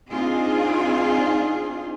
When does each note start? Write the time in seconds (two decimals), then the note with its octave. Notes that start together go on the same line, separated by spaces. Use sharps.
0.11 C4 D4 D#4 F4 G#4 F5